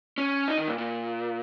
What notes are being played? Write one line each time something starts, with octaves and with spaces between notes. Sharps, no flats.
C#4
D#4
D#3
A#2
A#2